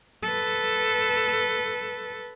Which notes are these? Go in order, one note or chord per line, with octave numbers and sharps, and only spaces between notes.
A4 B4